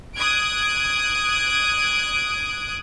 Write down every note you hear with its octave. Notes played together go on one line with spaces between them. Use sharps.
D#6 F#6 G#6 D7